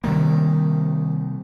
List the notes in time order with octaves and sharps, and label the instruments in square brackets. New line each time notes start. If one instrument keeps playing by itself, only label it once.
[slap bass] C3 G3 A#3 [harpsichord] D#3